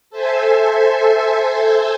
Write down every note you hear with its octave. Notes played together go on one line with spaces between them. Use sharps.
A4 C5 E5 G#5